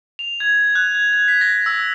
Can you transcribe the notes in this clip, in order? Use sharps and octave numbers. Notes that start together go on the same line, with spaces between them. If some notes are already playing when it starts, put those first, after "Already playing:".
F7
G#6
F#6
G#6
G#6
B6
A#6
E6